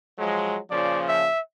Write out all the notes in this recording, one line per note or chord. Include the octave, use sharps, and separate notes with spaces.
F3 F#3 G#3
A#2 C#3 F3 D5
E5